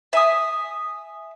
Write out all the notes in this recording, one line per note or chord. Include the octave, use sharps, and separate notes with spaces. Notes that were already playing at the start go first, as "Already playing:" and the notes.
E5 G#5 D#6